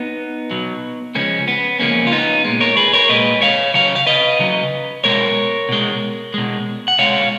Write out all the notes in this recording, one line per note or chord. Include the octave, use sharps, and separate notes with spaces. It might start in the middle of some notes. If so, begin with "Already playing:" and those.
Already playing: B3 D#4
B2 F#3
C#3 F3 G#3 A#3 C#4
B3
C#3 F3 G#3 A#3 C#4
F4
B3 D#4
A#2 G#3
A#4 C#5
G#4 B4
A#4 C#5
A#2 G#3 B4 D#5
C#5 F5
C#3 F#3 C#5 F5
F5
B4 D#5
C#3 F#3
B2 G#3 A#4 C#5
B2 G#3
B2 G#3
F#5
B2 G#3 C#5 F5